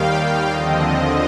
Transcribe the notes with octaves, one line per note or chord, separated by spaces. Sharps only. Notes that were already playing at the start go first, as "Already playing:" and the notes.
Already playing: D#2 D#3 G3 F5 G5
F5
D#2 D3 F3 C4 D#5
D#5